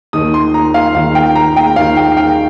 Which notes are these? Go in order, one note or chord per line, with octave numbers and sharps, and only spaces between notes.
D#2 D#3 D#6
C6
A#5
F5
D#2 D#3 F5
G5
A#5
G5
D#2 D#3 F5
G5
G5